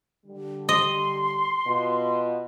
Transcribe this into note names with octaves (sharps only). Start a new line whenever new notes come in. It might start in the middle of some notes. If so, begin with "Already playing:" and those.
D3 G3
D#5 C6
B2 F4